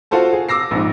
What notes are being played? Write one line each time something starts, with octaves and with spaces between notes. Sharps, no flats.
F4 F#4 A4 C5 A5
G#4
D6 E6 A#6 C7
A#1 G#2